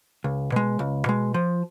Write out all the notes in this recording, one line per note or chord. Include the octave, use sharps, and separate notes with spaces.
C#2
B2 G#3
C#2
B2 G#3
F3